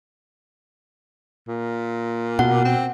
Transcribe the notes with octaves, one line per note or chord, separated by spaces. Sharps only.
A#2
B2 F#5
C4